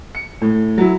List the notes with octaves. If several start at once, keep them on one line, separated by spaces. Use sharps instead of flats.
C#7
A2
F#3 E4